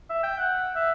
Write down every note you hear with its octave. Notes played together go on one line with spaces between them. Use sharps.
E5
G5
F#5
E5